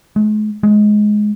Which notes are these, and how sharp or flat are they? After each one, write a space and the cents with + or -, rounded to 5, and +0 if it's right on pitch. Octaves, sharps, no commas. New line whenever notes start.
G#3 +45
G#3 +15